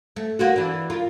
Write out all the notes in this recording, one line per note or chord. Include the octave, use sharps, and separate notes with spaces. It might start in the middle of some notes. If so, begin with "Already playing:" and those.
A3
A#3 F4 F#4
E3 D4
F4 A#4